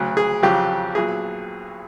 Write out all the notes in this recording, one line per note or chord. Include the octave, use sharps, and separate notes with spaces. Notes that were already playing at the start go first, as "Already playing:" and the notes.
Already playing: D2 C#3 F#3
G#4
F2 C#3 F#3 G4
B1 A#2 F#3 G#4